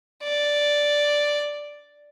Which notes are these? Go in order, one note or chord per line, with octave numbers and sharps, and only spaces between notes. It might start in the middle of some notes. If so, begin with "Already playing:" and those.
D5